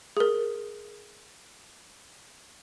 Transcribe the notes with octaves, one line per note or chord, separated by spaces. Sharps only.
G#4 A#4